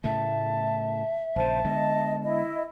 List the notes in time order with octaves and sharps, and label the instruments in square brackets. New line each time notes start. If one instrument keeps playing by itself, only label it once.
[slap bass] A2 C#3 A3 [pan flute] E5 [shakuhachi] A5
[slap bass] A#1 C#3 [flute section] C5 [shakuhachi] A5
[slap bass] D3 G#3 B3 [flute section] D#5
[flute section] E4 D#5